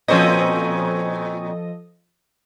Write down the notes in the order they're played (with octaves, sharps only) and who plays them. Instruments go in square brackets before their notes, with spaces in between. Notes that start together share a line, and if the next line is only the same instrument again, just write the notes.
[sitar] A#2 C4 C#4 [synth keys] F3 A4 D#5